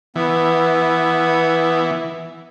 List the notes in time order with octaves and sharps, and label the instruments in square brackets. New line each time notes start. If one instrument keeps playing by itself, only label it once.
[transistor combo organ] E3 [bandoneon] B3